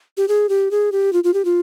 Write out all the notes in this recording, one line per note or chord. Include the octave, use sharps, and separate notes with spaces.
G4
G#4
G4
G#4
G4
F4
F4
G4
F4